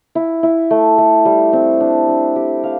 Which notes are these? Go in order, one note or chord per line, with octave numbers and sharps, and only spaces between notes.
E4
E4
A3
A3
G3
C4
D4
D4
G4
F5